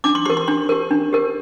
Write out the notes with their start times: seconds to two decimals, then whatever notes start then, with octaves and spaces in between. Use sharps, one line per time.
0.04 D4 D6
0.15 C6
0.26 G4 A#4 C6
0.37 C6
0.48 D4 C6
0.69 G4 A#4
0.91 D4
1.13 G4 A#4